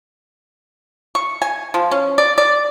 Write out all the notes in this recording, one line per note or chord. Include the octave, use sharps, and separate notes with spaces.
C#6
G#5
F3
C#4
D5
D5